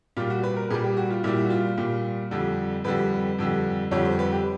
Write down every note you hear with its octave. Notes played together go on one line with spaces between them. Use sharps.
A#2 G3 F4
F#4
B4
A#4
A#2 G3 G#4
G4
F#4
F4
A#2 G3 E4
F#4
F4
A#2 G3
F2 D3 G3
F2 D3 G3 B4
F2 D3 G3
F2 D3 G3 C#5
C5
B4
G4